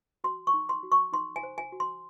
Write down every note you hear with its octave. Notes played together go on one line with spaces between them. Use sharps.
F#4 C6
C#6
D#4
C6
F#4
C#6
D#4 C6
G#5
C5
G#5
F#4
C6